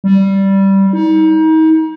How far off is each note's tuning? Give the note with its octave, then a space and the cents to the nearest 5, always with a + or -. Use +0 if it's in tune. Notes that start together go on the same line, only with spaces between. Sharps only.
G3 -10
D#4 +35